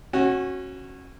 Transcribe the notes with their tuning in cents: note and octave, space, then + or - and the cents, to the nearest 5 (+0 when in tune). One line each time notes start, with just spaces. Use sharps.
C#4 -25 F#4 +0